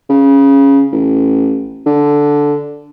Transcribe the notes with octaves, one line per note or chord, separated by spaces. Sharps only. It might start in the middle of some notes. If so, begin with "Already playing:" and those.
C#3
A1
D3